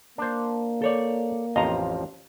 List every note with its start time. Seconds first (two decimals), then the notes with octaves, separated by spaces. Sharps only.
0.18 A#3 D4 C5
0.82 A4 C#5 D5
1.56 A1 F2 F3 D#5 F5 A#5